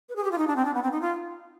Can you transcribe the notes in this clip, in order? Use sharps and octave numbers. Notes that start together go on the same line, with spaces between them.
B4
G#4
G4
F4
D#4
D4
C4
D4
B3
C4
D#4
F4